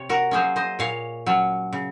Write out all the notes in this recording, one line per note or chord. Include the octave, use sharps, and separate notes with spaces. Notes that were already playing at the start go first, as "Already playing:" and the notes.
Already playing: C3 C#5
F#4 A#4
F#3 A#3 C#4 G#4 C5
C5 D#5
A#2 C#5 F5
F#3 C#4
C#3